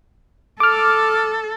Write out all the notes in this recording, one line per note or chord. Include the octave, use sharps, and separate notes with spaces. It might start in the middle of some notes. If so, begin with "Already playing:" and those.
A4 D6 F6